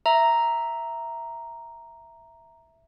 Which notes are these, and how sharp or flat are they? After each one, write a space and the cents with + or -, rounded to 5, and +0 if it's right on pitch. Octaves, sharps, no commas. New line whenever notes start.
E5 +0 A#5 +0